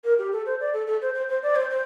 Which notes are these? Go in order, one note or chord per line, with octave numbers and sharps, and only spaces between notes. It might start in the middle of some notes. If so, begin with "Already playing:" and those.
A#4
G4
A4
C5
D5
A4
A4
C5
C5
C5
D5
C5
C5